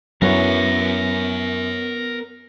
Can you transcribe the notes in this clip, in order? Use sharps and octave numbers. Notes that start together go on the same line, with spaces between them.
F#2 F#3 B3 C#4 E4 A#4 C#5